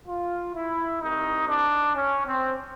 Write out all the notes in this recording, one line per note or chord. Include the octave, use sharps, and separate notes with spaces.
F4
E4
C2 C3 D#3 D#4
D4
C#4
C4